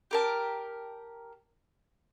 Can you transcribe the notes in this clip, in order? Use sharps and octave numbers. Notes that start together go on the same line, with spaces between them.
G4 A#4 A5